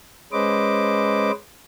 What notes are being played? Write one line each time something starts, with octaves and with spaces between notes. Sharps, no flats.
G#3 C#4 B4 C5 D#5 D6